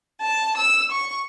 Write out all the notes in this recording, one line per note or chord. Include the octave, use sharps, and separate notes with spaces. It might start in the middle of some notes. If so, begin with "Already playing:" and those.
A5
E6
C#6